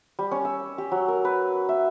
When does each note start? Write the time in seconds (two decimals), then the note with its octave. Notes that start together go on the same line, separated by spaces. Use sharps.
0.19 G3
0.31 C#4
0.45 E6
0.78 G4
0.92 F#3
1.08 A#4
1.25 B4
1.69 E5